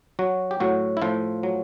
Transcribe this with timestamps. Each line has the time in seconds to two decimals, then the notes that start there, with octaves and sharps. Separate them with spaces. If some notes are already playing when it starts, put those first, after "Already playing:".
0.19 F#3 F#4
0.51 G4
0.60 A2 F#3 F#4
0.97 E4
1.02 A2 F3 F4
1.43 F#3